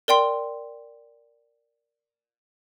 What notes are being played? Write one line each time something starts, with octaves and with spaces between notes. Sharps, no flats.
A#4 D5 G5 C6